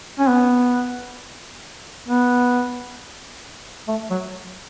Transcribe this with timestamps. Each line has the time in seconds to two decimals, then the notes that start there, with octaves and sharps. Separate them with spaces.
0.19 C#4
0.29 B3
2.08 B3
3.88 A3
4.10 F#3